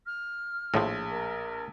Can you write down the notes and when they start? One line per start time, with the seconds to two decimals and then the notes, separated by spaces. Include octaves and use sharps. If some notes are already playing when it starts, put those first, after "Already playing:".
0.06 F6
0.74 A#1 A2 F3
1.10 A#4